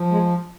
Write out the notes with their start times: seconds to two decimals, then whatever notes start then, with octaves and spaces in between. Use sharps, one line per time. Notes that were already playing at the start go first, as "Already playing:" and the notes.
Already playing: F3
0.11 G#3